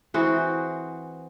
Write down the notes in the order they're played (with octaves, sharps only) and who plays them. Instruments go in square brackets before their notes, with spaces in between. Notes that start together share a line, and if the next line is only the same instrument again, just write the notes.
[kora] E3 C4 F#4 G#4